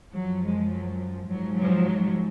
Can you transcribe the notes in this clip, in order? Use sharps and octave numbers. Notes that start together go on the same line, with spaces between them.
F#2 F3 F#3
G#3
F#3
G#2 F3 F#3
F#3